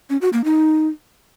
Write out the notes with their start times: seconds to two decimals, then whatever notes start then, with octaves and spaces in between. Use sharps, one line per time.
0.10 C#4
0.21 F#4
0.33 A#3
0.44 D#4